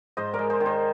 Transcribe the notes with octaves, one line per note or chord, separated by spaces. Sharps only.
G#2 C5 D#5
A#4 D5
G#3
G#4 C5
D#3
C5 D#5